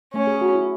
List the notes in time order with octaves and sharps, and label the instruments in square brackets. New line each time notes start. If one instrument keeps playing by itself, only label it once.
[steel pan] A3 [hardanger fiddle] C#4
[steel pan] G#4
F#4
E4